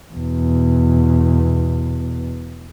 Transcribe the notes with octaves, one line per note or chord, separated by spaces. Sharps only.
E2 B2